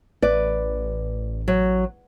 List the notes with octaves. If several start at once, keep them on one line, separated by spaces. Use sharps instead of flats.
A1 B4 D5
F#3